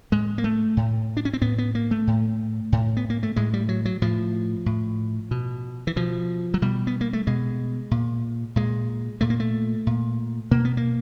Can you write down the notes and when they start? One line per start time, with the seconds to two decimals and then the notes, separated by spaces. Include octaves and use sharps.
0.12 A2 G#3
0.38 A#3
0.44 A3
0.77 A2
1.17 D4
1.25 C#4
1.33 C4
1.41 A2 B3
1.58 B3
1.75 A#3
1.91 A3
2.07 A2
2.72 A2
2.97 B3
3.10 A#3
3.23 A3
3.36 A2 G#3
3.54 G3
3.69 F#3
3.85 F#3
4.02 A2 F3
4.66 A2
5.31 B2
5.87 E3
5.96 B2 F3
6.54 F#3
6.62 B2 G3
6.87 B3
7.01 A#3
7.13 A3
7.27 B2 G#3
7.91 A#2
8.56 A#2 G#3
9.21 A#2 A3
9.30 A#3
9.40 A3
9.87 A#2
10.51 B2 A#3
10.65 B3
10.77 A#3